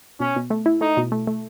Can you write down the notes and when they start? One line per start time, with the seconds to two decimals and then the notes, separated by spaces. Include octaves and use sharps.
0.20 B2 C#4
0.36 B2
0.50 A3
0.66 E4
0.81 A3 D#4
0.97 B2
1.12 A3
1.27 A3